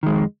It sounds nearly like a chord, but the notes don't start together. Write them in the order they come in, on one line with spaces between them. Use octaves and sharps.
D#3 G#3 F2